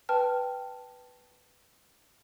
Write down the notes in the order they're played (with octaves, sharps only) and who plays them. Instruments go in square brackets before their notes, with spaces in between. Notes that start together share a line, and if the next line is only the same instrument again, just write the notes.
[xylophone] B4 G5 A5 F6